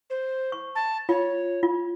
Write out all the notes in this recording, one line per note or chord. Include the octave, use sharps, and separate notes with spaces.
C5
C#6
A5
F4 C#5
F4